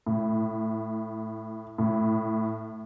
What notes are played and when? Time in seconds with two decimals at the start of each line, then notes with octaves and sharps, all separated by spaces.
0.07 A2
1.78 A2